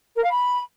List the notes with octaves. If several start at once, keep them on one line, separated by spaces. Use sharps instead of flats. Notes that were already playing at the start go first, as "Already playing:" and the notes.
A#4
F5
B5